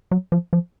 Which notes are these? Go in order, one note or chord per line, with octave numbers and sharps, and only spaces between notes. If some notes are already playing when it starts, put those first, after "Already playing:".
F#3
F3
F3